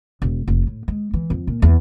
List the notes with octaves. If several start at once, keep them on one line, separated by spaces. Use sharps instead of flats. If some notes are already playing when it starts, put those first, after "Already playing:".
E1
F1
A2
G#3
E3
F2
A#2
E2